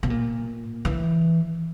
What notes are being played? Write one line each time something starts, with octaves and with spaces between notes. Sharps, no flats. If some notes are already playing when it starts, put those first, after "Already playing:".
B2
A#2
E3